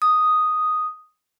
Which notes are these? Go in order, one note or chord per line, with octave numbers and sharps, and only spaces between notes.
D#6